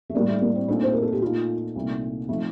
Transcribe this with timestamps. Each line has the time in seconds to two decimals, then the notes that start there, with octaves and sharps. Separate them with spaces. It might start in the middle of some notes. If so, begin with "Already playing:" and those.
0.10 A3
0.14 A2 G3 A#3 D4
0.28 A3
0.42 A#3
0.55 C4
0.68 A#2 A3 C4 D4 D#4
0.83 C5
0.92 A#4
1.02 A4
1.13 G4
1.22 A#2 A3 D#4 F4
1.75 C2 A#2 A3 D#4
2.29 F3 A3 C4 D#4